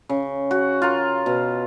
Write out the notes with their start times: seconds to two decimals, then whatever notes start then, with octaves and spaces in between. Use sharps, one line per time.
0.09 C#3
0.51 F#4
0.82 F4 A#4
1.26 B2